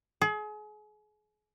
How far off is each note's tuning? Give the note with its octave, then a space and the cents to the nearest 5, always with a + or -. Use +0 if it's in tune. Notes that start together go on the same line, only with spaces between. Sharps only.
G#4 +35